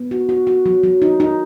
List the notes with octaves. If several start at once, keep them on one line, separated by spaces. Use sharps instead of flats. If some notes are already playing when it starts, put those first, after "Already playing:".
Already playing: B3
F#4
F#4
F#4
F#3
F#3
D#4
D#4